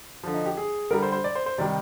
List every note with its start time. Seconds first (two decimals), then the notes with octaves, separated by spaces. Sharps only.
0.24 D3 F3
0.34 D#4
0.46 G4
0.57 G#4
0.90 D3 G3 A#4
1.02 C5
1.12 C5
1.24 D5
1.35 C5
1.46 C5
1.58 C3 D#3 G3 D5